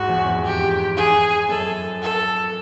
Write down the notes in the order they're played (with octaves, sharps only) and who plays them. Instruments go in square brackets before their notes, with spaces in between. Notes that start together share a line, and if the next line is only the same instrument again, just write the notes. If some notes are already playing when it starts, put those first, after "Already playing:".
Already playing: [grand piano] G#2 [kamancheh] F#4
[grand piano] E2
F2
[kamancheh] G4
G#4
[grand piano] F#2 [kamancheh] A4
[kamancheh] A4